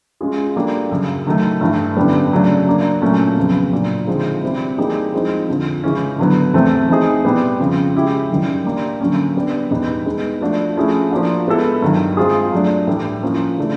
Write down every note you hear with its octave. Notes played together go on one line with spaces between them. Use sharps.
G#3 C#4 F4 G#4
G3 A#3 D4 F#4 A4
F#2 C#3 F#3
D#3 F#3 A3
G2 E3 A3
F#2 D3 G3 B3
C#3 F#3 A3 D4
F#3 A#3 D4
A#2 F#3 A3 C#4
F2 C#3 F#3 B3
A#2 F#3 A#3 D4
D3 F3 G#3 C4 D#4
C3 E3 G3 C4 E4
E3 G3 A#3 D#4 G#4
F3 G#3 C4 D#4
F2 D3 F3
C#3 E3 G#3 C#4
D3 F#3 B3
E2 C3 E3 A3 C4
E3 A3 C4 D#4 G#4
B2 G3 B3
F2 C#3 F3
G#3 C#4 E4 G4
F#2 D#3 G3
G3 A#3 D4
D3 F#3 A#3 C#4
G3 B3 D4
E2 B2 G3 B3 D#4
G#3 B3 D#4
F3 A3 D4 F#4
F3 A3 C#4 E4 G#4
F3 A#3 D4 F#4
G#3 B3 E4 A4
G2 D#3 F#3
G#3 C4 F4 G#4
F#3 A3 D4
A2 E3 G3
F3 A#3 C#4
C#3 E3 A3 D4